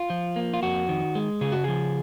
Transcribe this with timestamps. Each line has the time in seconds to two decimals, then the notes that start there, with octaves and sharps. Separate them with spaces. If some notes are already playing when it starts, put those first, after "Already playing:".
Already playing: F4
0.10 F3
0.36 A#3
0.54 F4
0.63 F2 F#4
0.89 D#3
1.15 G#3
1.41 C#3 G#4
1.52 F#4
1.64 F3 G#4